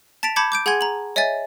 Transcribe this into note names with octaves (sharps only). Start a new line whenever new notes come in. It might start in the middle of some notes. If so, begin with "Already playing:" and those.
A5 A6 B6 D7 F7
A5 B5 D6 G6 G#6 C#7
D6 G6 D7
G#4 F#5 G#5 C6 G#6 D#7
A#5 F#7
C#5 D#5 E5 G#5 A6